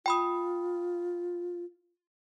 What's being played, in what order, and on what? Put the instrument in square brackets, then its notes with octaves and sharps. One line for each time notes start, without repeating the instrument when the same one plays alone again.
[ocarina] F4 [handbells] G5 B5 D#6